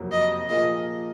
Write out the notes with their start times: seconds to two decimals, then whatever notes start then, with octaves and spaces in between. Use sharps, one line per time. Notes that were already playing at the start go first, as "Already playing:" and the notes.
Already playing: F#1 F2 C3 F#3 A#3
0.12 D#5
0.49 A#2 F3 A#3 F4 G#4 D#5